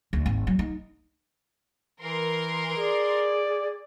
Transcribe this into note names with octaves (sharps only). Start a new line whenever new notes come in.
D2
G#1
F#3
D#4
E3 A#4 C6
G#4 D5